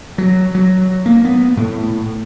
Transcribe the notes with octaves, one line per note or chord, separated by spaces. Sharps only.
F#3
F#3
A#3
B3
A2